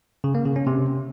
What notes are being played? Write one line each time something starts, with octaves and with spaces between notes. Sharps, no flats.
C#3
A#3
C#3
C#4
C3